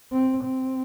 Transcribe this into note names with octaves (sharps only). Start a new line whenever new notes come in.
C4
C4